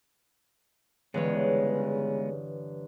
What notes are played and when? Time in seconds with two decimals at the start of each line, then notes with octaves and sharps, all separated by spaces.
1.14 G1 C#3 E3 G#3 B3 C#5